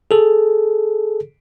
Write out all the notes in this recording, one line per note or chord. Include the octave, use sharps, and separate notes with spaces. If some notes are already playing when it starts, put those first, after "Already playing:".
G#4 A4